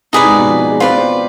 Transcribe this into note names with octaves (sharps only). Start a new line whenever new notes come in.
C3 D#4 G#4 B4 D5
G#2
B2
F3
G#3
C4 F4 B4 D5
B3
C4